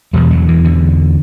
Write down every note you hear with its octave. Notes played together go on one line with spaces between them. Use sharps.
E2 B2 G3
F#3
E3
D3